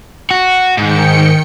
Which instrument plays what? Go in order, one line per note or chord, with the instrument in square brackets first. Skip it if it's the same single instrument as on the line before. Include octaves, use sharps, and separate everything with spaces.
[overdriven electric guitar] F#4
[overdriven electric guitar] G#2 [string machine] D#3 G5 C#7